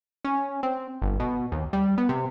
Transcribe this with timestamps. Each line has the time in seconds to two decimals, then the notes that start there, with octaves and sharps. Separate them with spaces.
0.25 C#4
0.63 C4
1.02 G1
1.20 B2
1.52 D#2
1.73 G3
1.98 B3
2.09 C3